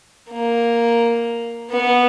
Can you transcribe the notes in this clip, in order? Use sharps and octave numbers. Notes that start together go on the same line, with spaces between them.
A#3
B3